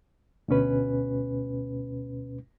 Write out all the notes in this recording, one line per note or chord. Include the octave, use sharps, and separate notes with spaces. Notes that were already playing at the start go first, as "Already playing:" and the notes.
D2 B2 C#4 B4